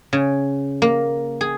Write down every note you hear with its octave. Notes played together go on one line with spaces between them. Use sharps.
C#3
A#3
G#4